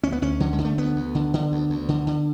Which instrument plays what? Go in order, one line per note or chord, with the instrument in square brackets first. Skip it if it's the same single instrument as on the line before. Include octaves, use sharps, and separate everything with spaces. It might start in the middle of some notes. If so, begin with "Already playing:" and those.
[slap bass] D2 C#4
B3
D2 C#4
D3 F#3
G#3
D3
A3
D2 B3
D2
D3
D3
D2
D2
D3
D3